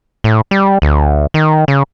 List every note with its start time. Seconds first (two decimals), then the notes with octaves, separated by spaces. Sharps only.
0.24 A2
0.51 G3
0.82 D2
1.34 D#3
1.68 C#3